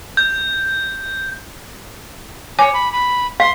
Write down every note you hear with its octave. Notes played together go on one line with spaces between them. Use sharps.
G6
C#5 G#5 D6 C#7
B5
B5
F5 C6